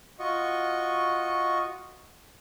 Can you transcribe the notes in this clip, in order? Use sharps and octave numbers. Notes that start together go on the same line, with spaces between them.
F4 F#4 D#5 C#6